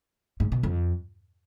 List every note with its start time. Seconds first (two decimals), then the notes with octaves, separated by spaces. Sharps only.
0.40 G#2
0.52 B2
0.63 F2